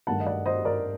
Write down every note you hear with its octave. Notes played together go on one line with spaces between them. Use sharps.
G2 D#3 A3 F#5 A5
D#5
D5 F#5
C5 D#5
A#4 D5